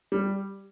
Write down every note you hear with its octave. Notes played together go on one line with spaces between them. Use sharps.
G3